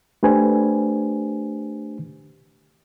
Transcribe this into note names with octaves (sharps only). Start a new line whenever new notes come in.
A3 D4 G4 B4 C5 G#5